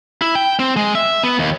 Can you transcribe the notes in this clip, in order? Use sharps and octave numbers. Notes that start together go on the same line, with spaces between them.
E4
G5
C4
G#3
E5
B3
D#2